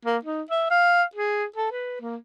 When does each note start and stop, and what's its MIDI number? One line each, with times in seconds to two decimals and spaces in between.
0.05 0.17 58
0.25 0.42 63
0.50 0.67 76
0.70 1.03 77
1.15 1.45 68
1.56 1.70 69
1.71 1.97 71
2.01 2.16 58